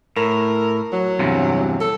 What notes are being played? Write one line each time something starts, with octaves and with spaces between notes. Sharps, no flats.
A2 A#4
F#3
E2 G2 C3
A4